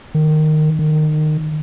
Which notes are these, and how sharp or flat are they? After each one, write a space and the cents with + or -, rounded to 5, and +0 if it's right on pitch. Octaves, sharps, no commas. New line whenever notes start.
D#3 -15
D#3 -25